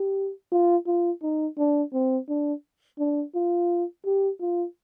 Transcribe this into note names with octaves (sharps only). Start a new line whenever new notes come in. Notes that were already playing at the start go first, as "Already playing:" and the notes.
Already playing: G4
F4
F4
D#4
D4
C4
D4
D4
F4
G4
F4